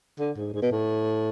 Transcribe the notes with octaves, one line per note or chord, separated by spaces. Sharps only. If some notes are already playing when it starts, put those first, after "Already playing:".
D3
G#2
G#2
B2
A2